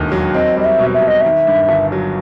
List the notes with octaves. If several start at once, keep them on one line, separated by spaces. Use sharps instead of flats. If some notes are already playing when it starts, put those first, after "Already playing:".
Already playing: E1 D#2 D3
F#3
C4 D#5
G3 D#5
E5
B2
E5
B2
D#5
D#3 E5
G2
G1
F#3